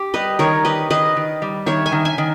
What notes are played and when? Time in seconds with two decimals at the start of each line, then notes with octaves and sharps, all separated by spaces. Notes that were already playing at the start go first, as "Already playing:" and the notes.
Already playing: G4
0.14 G3 B4 D#5
0.39 D#3 A#4 C#5
0.65 G4 B4 D#5
0.90 D#3 B4 D#5
1.17 D#3
1.42 G3
1.66 D#3 C#5 E5
1.86 E5 G#5
1.92 D#3
2.05 E5 G#5
2.18 D#3